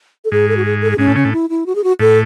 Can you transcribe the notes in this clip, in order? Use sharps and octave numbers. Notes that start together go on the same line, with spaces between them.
A4
G#2 G#4
A4
F#4
G#4
A4
G#4
G#2 C#4
A2
C#3 C#4
A2
E4
E4
F#4
G#4
F#4
A2 A4